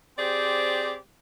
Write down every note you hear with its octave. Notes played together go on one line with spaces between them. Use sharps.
C4 G4 G#4 C5 D5